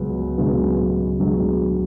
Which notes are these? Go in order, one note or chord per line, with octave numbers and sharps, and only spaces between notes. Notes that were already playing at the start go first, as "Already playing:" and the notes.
Already playing: C#2 C#3 F#3 B3
C#2 C#3 F#3 B3
C#2 C#3 F#3 B3